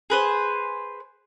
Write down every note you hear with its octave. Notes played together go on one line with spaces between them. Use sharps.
G#4 B4 C5